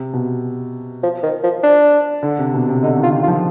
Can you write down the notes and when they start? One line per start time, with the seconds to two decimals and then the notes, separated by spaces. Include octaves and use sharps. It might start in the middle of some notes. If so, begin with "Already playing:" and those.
Already playing: C3
0.14 B2
1.03 F3
1.23 D#3
1.43 F3
1.63 D4
2.23 D3
2.39 C3
2.54 B2
2.69 C3
2.83 D3 D#4
2.98 D#3
3.03 F4
3.13 D#3
3.23 F4
3.28 F3